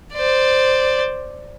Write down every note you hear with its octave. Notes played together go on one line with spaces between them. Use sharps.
C5 D5